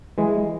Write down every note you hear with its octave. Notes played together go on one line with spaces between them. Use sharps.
E3 G#3